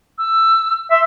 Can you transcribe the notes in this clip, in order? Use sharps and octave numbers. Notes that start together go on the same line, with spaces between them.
E6
E5 C6